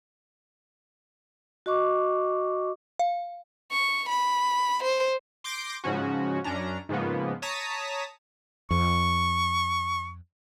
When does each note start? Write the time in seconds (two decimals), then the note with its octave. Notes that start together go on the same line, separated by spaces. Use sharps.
1.66 F#4 D#5 C#6 D6
2.99 F5
3.71 C#6
4.09 B5
4.83 C5
5.44 C6 D6 G6 A#6 D7
5.84 G#2 C#3 F3 C#4 F#4
6.44 F#2 C#4 D4 A#5
6.89 G#2 C#3 F3 A#3 B3
7.42 C#5 A5 A#5 D#6 B6
8.71 F2 C#6